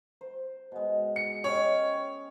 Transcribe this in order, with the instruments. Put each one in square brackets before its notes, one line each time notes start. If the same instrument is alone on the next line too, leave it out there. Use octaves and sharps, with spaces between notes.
[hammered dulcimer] C5
B2 G#3
[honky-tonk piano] C#7
[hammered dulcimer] C#4 D#5 G5 [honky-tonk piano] C#5